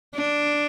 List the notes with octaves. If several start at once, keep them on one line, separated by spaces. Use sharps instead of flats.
D4